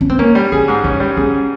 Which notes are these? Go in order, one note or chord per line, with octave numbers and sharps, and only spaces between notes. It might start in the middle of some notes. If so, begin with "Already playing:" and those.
C#4
C4
A#3 C#4
G3
C#4 G#4
G#2
C#4 D#4
G3
C#4 G#4